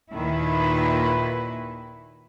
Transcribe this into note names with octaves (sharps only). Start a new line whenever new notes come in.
D#2 A#2 D#3 E4 B4